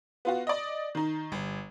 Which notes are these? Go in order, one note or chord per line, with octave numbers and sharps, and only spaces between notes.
B3 F4 F#4
D5 D#5
D#3 D#4
G1